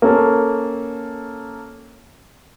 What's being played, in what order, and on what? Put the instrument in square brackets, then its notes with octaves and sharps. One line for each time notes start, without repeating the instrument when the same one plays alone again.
[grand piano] A#3 C#4 A4